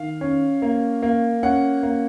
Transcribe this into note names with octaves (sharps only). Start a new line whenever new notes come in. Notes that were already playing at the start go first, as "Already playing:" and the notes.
Already playing: D#3 F5
C#4
A#3
A#3
C#4 F#5
A#3